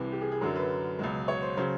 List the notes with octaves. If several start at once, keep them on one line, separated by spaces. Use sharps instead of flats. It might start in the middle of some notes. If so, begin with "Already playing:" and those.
Already playing: C2 C3 E3
G4
G#4
G#4
F#2 D3 F#3 A#4
B4
C#2 B2 F#3
C#5
C5
C#3 F#3 C5